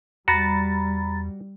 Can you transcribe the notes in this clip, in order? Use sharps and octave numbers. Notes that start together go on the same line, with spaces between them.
E2 G3 F#4 A#5 B5 A6